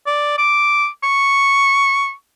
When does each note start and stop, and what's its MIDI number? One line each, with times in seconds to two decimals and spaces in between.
0.07 0.38 74
0.38 0.87 86
1.03 2.12 85